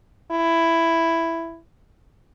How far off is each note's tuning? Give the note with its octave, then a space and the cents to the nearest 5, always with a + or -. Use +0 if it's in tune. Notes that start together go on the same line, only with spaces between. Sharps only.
E4 +5